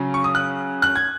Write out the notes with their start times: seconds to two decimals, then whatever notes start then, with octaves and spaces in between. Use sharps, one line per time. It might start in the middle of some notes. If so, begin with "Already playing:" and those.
Already playing: C#3 F#3 C#4
0.14 C#6
0.24 D#6
0.35 F#6
0.82 F#6
0.96 G#6